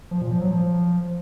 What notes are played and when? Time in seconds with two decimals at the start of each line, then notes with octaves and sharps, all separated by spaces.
0.11 F3
0.21 A#2
0.31 F3
0.41 F#3
0.51 F3